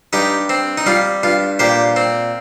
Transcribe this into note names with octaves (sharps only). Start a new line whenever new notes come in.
G2 D#4 G4
C4
D#4
G3 F4
G2 F4
A#2 G4 C5
C4